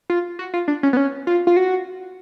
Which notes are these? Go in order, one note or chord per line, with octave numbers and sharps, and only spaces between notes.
F4
F#4
F4
D4
C#4
B3
C#4
F4
F4
F#4